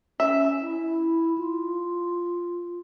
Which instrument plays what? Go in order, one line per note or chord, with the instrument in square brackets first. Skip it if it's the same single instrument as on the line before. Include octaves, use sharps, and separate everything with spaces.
[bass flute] C#4 [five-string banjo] E5
[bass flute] E4
F4